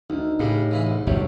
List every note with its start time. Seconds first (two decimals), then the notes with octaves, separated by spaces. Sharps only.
0.10 D2 D4 D#4
0.40 A2 C#3 G3
0.71 C#3 E3 E4
0.87 C2
1.07 G1 E2 C3 F#3 C#5 E5